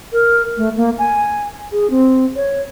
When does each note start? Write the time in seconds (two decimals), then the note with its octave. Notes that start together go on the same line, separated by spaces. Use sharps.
0.13 A#4
0.57 A3
0.77 A#3
0.98 G#5
1.72 G#4
1.90 C4
2.36 C#5